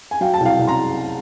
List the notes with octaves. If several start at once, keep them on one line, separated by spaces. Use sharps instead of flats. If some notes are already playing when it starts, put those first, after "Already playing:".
G#5
F#3 F5 G5
G5 A5
C2
F5 G5
C2
A#5 C6